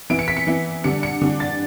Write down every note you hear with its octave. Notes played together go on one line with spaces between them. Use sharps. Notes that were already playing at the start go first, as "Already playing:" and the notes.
E3 B3 E4 D7
C#7
B6
C#7
E3 B3 E4
D3 G3 D4 C#7
C#7
D3 G3 D4
A6